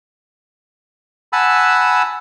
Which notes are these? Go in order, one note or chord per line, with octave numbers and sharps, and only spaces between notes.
F#5 G#5 A5 B5 E6